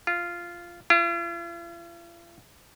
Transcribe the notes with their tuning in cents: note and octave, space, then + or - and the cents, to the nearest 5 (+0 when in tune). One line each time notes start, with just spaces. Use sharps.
F4 -10
F4 -45